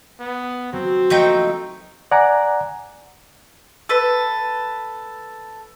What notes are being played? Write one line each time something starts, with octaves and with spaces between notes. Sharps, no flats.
B3
F#3 C4
F3 A3 A#3 D#4 G5
D5 F#5 G#5 A#5 D6
A4 B4